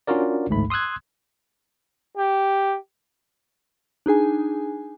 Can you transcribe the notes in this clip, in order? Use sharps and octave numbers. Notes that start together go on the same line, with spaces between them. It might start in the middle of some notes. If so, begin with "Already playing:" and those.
C#4 D4 F4 F#4 A#4 D5
A1 D2 G#2 A3 B5
C6 D#6 E6 F#6 G#6
G4
D4 D#4 G#4 G#5